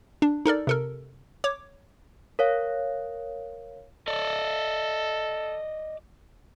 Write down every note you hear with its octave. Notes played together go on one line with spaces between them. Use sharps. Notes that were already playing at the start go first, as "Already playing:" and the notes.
D4
D#4 A4 A#4 D5
C3 A4 A#4
C#5 D6
A#4 C#5 F5
A4 D5 D#5